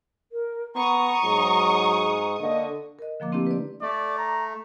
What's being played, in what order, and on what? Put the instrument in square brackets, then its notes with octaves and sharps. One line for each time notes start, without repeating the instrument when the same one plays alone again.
[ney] A#4
[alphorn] B3 [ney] A#5 [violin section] C#6 D#6
[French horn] G#2 [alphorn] F#3
[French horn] D3 [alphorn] A#3 [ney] D#5
[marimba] A#4 D#5
D3 F3 A#3 D6
A3 C4 D4 E4 G4
B4 D5
[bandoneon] A3 [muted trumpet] D5
[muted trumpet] A#5